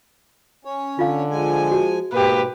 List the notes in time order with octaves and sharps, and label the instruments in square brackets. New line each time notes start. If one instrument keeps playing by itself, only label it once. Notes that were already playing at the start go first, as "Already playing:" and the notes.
[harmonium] C#4 C#5
[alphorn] D3 [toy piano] F4 F5
[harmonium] F3 G#3 G#5
[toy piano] F#4
[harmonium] G#2 B2 [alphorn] A#3 [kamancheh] G4 B4